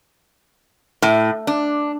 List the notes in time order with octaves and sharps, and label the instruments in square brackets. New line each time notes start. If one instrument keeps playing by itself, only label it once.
[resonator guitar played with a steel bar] A2
D4